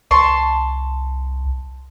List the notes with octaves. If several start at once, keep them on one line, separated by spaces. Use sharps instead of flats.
C2 A5 C6 C#6